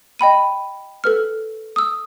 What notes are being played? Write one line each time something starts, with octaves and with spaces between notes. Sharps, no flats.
D#5 G5 B5 D#7
A4 B4 F6
D#6 E6